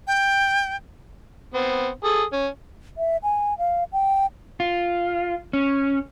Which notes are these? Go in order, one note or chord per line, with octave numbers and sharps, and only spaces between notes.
G5
B3 C4
G#4 A4 D#6
C#4
E5
G#5
F5
G5
F4
C#4